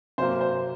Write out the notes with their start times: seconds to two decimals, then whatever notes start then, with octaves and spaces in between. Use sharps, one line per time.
0.18 C3 F#3 A#3 C5
0.41 C5